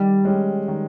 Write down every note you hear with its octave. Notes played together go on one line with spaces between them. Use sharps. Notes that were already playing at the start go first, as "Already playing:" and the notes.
Already playing: D#3 G3
G#3 C#4 G4
D#3